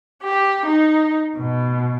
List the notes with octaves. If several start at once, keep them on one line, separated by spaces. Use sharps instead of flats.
G4
D#4
B2